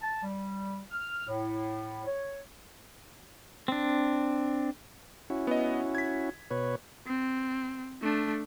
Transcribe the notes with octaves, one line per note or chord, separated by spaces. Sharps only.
A5
G3
F6
A2
C#5
C4 D4
C#4 E4 F#4
B3 D#5
G#6 B6
B2 B4 C#5
C4
A3 D4